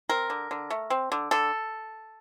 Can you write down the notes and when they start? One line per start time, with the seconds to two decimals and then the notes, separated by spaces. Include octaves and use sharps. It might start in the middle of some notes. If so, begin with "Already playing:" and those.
0.09 C4 A#4
0.30 D3
0.51 D3
0.70 A3
0.90 C4
1.12 D3
1.31 D3 A4